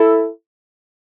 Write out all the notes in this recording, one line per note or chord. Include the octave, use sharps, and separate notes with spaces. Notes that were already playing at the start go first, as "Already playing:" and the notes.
Already playing: E4 A4